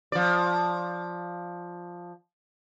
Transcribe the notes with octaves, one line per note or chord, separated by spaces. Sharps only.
F3 D5